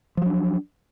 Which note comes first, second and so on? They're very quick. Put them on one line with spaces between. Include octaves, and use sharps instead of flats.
F3 F#3 D4